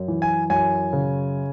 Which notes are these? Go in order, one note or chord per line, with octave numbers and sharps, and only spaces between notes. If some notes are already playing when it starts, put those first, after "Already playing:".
Already playing: F#2
E3
G#5
F#2 G#5
C#3